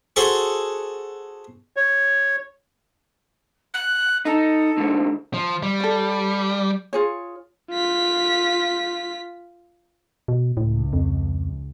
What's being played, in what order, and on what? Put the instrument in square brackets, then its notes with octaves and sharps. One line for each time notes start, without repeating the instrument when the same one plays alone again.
[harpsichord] F#4 G#4 A4 C5 A5 C#6
[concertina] C#5
[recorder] F#6
[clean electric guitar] D#4 [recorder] A4
[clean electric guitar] D2 G#2 D3
[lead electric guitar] F3
G3
[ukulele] A4 C#5
F4 G#4 C#5
[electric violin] F4 B6
[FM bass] B2
[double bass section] C#2 [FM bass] A2
[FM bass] F2